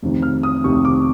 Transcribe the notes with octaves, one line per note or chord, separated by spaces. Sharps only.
F1 F2 C3 D#3
F6
D#6
F1 F2 C3 D#3 C#6
D6